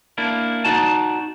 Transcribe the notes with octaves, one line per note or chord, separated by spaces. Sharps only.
A#3 D4 E4
D#4 F#4 D5 A5